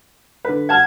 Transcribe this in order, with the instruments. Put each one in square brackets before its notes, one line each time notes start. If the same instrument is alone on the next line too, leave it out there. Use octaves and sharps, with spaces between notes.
[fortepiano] D3 B4
[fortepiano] F#5 A5 F6 [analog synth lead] G#6